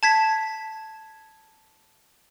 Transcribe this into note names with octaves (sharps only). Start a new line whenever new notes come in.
A5 G#6 B6